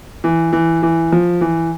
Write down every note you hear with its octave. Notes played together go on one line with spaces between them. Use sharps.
E3
E3
E3
F3
E3